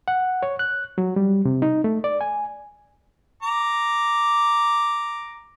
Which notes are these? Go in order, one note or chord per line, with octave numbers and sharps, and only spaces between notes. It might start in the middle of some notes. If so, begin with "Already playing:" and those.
F#5
C#5
F#6
F#3
G3
C3
D#4
A3
D5
G#5
A#5 D6